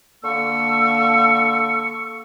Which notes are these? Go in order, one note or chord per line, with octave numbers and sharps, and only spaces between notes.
D3 A#3 C#6 E6